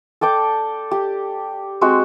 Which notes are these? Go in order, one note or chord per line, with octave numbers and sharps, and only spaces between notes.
A4 D5 G5 D6
G4
G#3 C4 F#4